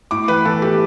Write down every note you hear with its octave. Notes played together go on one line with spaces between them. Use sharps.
A2 D6
E3 B4
E3 A4
A2 G4